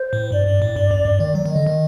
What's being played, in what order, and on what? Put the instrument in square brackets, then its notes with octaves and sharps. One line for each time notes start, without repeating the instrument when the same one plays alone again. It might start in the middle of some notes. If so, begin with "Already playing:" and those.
Already playing: [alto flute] C5
[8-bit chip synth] A2
[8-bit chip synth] G2 [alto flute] D5
[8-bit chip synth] G2
A2
G2
F#2
G2
D#3
F#3
[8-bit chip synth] D#3 [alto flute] D#5
[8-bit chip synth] D3
D#3